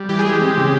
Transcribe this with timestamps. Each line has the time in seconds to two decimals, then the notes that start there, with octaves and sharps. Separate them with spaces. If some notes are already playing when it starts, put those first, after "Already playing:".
Already playing: G3
0.09 E3 G4
0.19 G#4
0.25 G#3 G4
0.41 C4
0.57 C#3